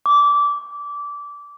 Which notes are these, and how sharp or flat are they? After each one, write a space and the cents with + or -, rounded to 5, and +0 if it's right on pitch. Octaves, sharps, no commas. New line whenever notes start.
D6 -20